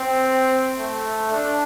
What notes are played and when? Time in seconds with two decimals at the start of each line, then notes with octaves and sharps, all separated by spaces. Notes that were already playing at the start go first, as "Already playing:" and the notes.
Already playing: C4
0.79 A3
1.32 D4